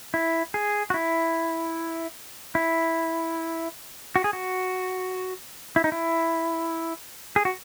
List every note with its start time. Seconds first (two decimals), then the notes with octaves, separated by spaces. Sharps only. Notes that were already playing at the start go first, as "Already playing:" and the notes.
0.14 E4
0.54 G#4
0.90 F#4
0.94 E4
2.55 E4
4.16 F#4
4.24 G#4
4.33 F#4
5.76 E4
5.84 D#4
5.92 E4
7.36 G#4
7.45 F#4